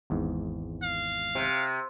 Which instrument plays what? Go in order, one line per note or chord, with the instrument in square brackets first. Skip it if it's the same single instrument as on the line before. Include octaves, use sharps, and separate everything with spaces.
[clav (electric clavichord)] G#1 E2 G#2
[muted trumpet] F5
[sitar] C3